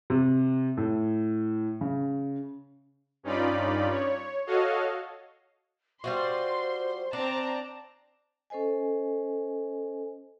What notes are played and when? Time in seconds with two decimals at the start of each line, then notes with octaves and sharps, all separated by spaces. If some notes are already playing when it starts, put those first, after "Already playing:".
0.10 C3
0.77 A2
1.81 C#3
3.23 G2 C#4 D#4 F4 D5 B5
3.91 C#5
4.47 F#4 A4 C#5 D#5 F5
6.04 G3 F4 F#4 C5 C6
7.13 C4 D4 A5 A#5
8.50 C#4 A4 C5 D#5 G#5